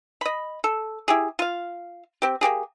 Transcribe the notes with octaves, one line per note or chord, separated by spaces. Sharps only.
D#5 B5
A4
E4 G4 G#4
F4 F5
C4 G4
A#3 C4 G4 G#4